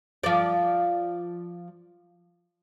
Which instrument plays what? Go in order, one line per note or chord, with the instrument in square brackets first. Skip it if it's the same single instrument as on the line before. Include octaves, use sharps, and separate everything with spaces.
[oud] F3 D5